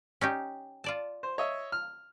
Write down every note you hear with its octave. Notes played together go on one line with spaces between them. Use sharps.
C#4 D#4 G4
F4 D5 A5
C5
C#5 D#5 E5
F6